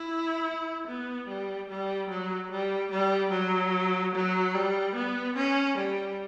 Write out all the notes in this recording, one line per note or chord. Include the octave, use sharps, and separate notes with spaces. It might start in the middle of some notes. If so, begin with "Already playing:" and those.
Already playing: E4
B3
G3
G3
F#3
G3
G3
F#3
F#3
G3
B3
C#4
G3